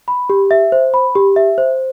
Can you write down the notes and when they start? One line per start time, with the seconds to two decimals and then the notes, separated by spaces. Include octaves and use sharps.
0.08 B5
0.30 G4
0.51 E5
0.72 C5
0.94 B5
1.15 G4
1.36 E5
1.58 C5